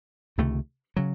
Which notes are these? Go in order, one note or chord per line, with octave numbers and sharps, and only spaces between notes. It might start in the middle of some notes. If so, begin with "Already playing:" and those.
C#2 C3 D#3 A3
C#3 F#3